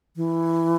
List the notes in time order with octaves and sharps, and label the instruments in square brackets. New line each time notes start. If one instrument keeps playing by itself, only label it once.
[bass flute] E3